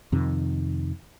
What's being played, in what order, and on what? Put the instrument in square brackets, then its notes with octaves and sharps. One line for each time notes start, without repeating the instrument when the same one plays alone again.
[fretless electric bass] F2 C3 D#3